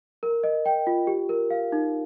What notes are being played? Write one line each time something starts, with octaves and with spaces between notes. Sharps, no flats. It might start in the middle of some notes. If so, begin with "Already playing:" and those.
A#4
D#5
G5
F4
G4
A#4
F5
D#4